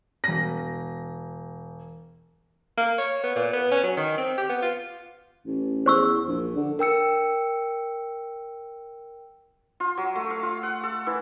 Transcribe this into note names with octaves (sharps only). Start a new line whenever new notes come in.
E1 A#6
A#3
C#5
B3
A#2
B3
C#4
F#3
D#3
C4
G4
B3
F4
A1
E2 C5 C#6 E6
A#1
D3
A#4 G5 E6 C#7
F4
F#3
A3
F5
F4
F#5
A4
E3